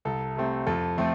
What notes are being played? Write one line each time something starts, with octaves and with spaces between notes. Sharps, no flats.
C2 A4
C3 A3 C4
F2 A4
F3 A3 C4